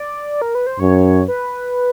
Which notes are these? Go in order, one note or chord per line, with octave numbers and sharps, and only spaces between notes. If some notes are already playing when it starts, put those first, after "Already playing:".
Already playing: D5
A#4
B4
C5
F#2 C#5
B4